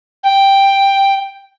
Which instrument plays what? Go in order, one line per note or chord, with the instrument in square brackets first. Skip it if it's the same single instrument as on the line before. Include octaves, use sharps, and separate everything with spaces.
[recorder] G5